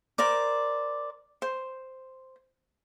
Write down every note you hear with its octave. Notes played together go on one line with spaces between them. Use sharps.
A#4 C5 D5 D6
C5